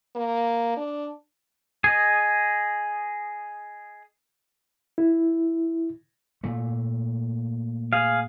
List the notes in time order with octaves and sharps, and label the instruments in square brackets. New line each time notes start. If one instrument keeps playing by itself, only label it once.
[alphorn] A#3
D4
[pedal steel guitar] G#4 D#5
[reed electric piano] E4
[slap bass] A#2 A3
[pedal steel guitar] G#4 F5